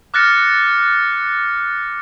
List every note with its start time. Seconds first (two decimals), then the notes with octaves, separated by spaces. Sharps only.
0.14 D6 F6 F#6 A6 A#6 C#7